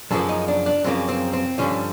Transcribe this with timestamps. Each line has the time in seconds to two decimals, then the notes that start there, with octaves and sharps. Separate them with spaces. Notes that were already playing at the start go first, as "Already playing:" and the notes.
0.11 F#2 C#3 F3 A#3 A4
0.29 D#4
0.48 D4
0.66 D4
0.84 F#2 C#3 F3 A#3 C4
1.08 C4
1.33 C4
1.58 G2 D3 F3 C#4